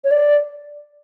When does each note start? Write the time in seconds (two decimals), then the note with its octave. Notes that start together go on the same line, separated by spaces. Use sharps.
0.04 C#5
0.11 D5